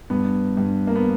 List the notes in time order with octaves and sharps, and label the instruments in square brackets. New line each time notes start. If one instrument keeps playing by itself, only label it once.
[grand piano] G2 B3
G2
A#3
B3